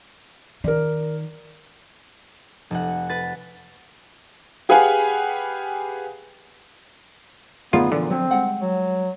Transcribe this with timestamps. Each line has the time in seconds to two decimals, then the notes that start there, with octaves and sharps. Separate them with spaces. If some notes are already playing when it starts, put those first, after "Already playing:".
0.64 D#3 A#4 D5
2.70 F1 F#5
3.09 B4 A6
4.69 G4 G#4 B4 F5 F#5 G#5
7.73 F#2 D3 A3 B3 D#4 F4 G#4 D5
7.92 A#2 D3 E3 F3 B3 D5
8.10 F3 F#3 C4
8.31 G3 G#3 F#5
8.61 F#3